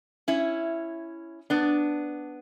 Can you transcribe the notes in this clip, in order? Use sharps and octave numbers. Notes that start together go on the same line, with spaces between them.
C#4 E4
B3 D4